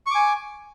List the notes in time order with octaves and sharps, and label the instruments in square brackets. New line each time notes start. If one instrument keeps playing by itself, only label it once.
[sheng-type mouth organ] C#6
D6
G#5